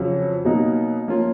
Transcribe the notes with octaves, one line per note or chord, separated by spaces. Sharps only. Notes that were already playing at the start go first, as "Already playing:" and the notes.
Already playing: F2 C#3 F#3
B2 F#3 A#3 D#4
F3 A#3 C#4 F4